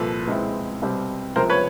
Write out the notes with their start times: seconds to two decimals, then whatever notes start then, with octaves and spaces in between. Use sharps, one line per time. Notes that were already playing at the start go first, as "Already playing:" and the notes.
Already playing: C2 A#2 F3 A4 B4
0.27 C#2 B2 G#3 C4 E4
0.82 C2 B2 G3 C4
1.36 C#2 C3 F3 A#4 C5
1.50 B4 C#5